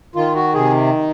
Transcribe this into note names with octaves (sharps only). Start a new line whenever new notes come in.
D#3 F4
F#4
C3 G#4